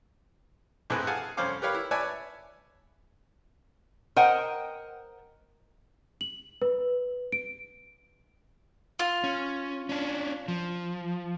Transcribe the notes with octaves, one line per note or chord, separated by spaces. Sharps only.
A#1 A2 C4 E4 G#4 B4
G#4 F5 F#5 G#5 A5
C2 F2 C#4 C5 F5 D6
G4 A#4 B4 C#5 F5
E4
B4 C#5 D5 E5 G#5 A5
A#4 C5 D#5 F#5 G5
F#7
B4
D7
F4
C#4
C#4 D4
F3